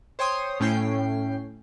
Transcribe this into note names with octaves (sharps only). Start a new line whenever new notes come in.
C5 C#5 G5 C6 D#6
A2 C#4 G5 C7